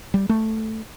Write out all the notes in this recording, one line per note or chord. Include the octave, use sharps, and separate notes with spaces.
G3
A3